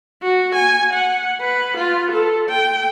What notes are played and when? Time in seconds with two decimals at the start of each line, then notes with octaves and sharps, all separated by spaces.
0.23 F#4
0.55 G#5
0.93 F#5
1.41 B4
1.77 F4
2.11 A4
2.49 G5